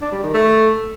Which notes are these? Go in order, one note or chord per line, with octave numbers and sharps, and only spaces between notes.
D4
G3
D#3
A3